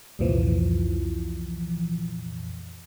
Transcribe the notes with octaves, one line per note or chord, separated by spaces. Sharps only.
C2 F2 A#2 E3 F3